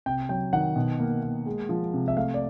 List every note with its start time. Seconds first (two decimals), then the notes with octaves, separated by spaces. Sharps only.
0.06 C3 G5
0.29 F#3 G5
0.53 D#3 F#5
0.76 B2
1.00 A#3
1.23 A#3
1.46 G#3
1.69 F3
1.94 C3
2.08 E5
2.16 A3 F5
2.34 D5